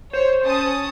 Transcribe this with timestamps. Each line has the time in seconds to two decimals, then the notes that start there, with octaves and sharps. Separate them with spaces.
0.13 C5 C#5
0.45 C#4 A5 D#6